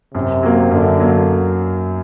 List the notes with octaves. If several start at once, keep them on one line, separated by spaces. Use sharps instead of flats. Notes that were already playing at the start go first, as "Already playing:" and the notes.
F#2 C3
F#3 A#3
F#2 D3
F#3 A#3